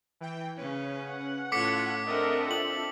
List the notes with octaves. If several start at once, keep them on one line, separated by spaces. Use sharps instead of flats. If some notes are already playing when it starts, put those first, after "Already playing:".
E3 G5
C#3 C#4 B4
F#5
A2 C#4 F4 A4 C#5 D6 B6 C#7
C4 D4 A4 A#4 D#5 E5 F#5
F4 F#7